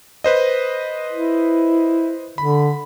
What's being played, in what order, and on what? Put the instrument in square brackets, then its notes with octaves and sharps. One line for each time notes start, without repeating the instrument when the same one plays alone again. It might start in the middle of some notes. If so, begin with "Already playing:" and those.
[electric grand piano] B4 C5 D#5
[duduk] E4
[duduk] D3 [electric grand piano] B5